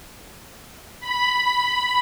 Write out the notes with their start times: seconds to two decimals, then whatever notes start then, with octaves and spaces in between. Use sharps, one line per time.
1.00 B5